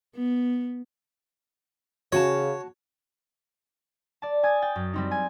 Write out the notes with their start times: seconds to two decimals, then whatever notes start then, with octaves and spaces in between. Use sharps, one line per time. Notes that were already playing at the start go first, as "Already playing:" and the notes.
0.16 B3
2.12 C#3 F#4 C#5 G#5 A5
4.22 D5 A5
4.43 G#5 D#6 G#6 A6
4.62 G5 A6
4.76 F#2
4.93 G3 C4 D#4
5.11 G#5